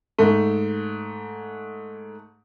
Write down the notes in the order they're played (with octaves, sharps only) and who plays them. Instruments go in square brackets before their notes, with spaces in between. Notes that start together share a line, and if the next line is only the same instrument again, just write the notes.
[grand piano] G#2 A3